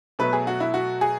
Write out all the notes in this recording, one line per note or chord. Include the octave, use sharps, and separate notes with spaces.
B2 F#3 A3 B4
G#4
F#4
E4
F#4
G#4